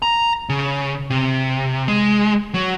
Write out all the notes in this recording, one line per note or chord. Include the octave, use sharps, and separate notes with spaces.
A#5
C#3
C3
G#3
F#3